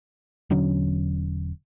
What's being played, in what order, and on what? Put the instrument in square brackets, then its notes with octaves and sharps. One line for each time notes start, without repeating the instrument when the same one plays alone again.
[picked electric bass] E1 D3 F#3 C#4